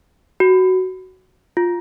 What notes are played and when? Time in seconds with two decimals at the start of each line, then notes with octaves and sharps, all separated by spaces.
0.40 F#4
1.57 F4